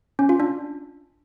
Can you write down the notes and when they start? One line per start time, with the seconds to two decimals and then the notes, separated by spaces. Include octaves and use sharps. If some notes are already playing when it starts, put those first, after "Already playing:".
0.19 C#4
0.29 F4
0.40 D4